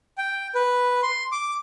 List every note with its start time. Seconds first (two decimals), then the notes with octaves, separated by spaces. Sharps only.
0.18 G5
0.55 B4
1.03 C6
1.32 D6